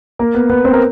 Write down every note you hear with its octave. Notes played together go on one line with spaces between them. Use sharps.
A#3 A#4
B3 B4
B3 B4
C4 C5
A#4